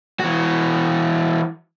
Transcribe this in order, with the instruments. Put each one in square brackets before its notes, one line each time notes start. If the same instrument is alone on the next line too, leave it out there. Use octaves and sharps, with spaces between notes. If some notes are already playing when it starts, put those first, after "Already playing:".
[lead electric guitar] E3 F#4